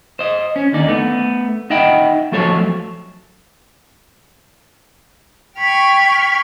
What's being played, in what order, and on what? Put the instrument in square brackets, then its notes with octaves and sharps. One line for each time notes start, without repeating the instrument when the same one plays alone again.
[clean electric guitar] C5 D#5
C#4
D#2 D3 D#4 D5
A3 B3
D#4 D#5 E5 F#5 G5 B5
F3 F#3 A3 A4 C5 C#5
[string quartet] G5 B5 C#6 F6 G#6